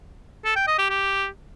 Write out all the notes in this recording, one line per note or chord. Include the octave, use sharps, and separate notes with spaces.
A4
G5
D#5
G4
G4